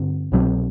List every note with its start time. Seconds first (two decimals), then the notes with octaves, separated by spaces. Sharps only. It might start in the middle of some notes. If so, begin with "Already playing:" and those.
Already playing: G2 D3 C4
0.32 C2 B2 F#3 C4